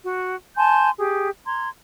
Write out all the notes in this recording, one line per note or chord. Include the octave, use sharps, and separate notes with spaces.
F#4
G#5 A5 C6 G6
G4 G#4
A#5 C6 G#6